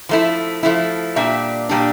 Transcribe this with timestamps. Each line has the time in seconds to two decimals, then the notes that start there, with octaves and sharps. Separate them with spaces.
0.09 F3 A3 E4
0.63 F3 A3 E4
1.16 A#2 G3 D4 E5
1.69 A#2 G3 D4